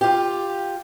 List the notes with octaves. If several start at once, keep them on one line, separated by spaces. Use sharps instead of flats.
F4 G4